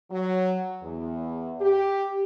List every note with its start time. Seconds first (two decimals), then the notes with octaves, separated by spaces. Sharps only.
0.11 F#3
0.82 E2
1.60 G4